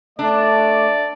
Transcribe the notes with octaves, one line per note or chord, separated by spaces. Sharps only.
A3 D4 D5